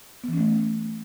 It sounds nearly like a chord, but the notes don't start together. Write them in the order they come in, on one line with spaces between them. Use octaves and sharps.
B3 E3 C#4 A3